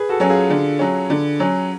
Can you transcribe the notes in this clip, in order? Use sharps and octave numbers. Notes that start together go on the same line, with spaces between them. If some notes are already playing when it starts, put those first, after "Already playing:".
Already playing: G#4 B4
F#4 A4
F#3 C#4
F4 G#4
D3
F#3 C#4
D3
F#3 C#4